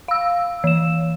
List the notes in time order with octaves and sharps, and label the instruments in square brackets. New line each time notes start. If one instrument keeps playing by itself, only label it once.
[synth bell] F5 E6
E3 E7